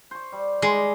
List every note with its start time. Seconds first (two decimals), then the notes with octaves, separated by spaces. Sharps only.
0.11 C5 C#6
0.32 G3
0.62 G3 G#3 D#5